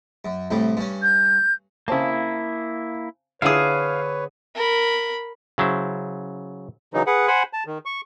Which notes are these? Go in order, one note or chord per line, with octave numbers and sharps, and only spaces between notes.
F#2
C2 A2 G3
G2 C#4
G6
C#3 A#3 C4 E4 A5
D3 E4 F4 G#4 B4 C#5 F5 D#6
A#4 B5
C#3 F#3 E4 C5
C#3 E3 F#3 D#4
G#4 B4 F#5
C5 F#5 G#5 B5
A5
D#3
C#6